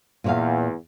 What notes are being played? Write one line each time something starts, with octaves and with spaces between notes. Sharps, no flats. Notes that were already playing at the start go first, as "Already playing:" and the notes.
E2 A#2 C#5 F5